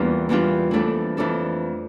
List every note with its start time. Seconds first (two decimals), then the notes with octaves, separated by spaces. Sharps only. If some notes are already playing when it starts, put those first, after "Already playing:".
Already playing: E2 E3 G3 A#3 D4 F4
0.29 E2 E3 G3 D4 F4
0.71 F2 E3 A3 D4 A4
1.17 F2 E3 A3 D4 A4